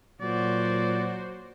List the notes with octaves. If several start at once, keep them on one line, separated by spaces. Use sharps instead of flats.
A#2 F#3 F#4 C5 D5